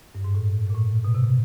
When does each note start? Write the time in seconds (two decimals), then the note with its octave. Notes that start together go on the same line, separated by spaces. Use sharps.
0.15 G2
0.24 G#2
0.35 A2
0.70 A#2
0.74 A2
1.05 B2
1.15 C3
1.24 B2